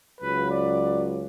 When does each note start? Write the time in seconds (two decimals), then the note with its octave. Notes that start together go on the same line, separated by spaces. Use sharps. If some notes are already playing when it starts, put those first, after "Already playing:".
0.21 C#2 C#3 F#3 B4
0.50 D5